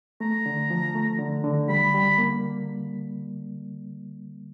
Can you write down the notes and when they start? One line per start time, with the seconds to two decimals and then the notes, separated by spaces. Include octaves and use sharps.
0.20 A3 A#5
0.46 D3
0.70 F3
0.95 A3
1.19 D3
1.44 D3
1.69 G3 B5
1.94 G3
2.18 A#3